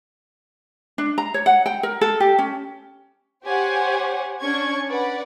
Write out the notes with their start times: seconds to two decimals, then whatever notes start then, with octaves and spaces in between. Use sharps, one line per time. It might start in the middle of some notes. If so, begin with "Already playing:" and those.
0.98 D4
1.18 A#5
1.34 C#5
1.46 F#5
1.66 G5
1.83 A#4
2.01 A4
2.20 G4
2.39 C#4
3.45 G4 C5 C#5 F#5 G#5
4.40 C#4 D4 C#6 G#6
4.88 B4 D5 F#5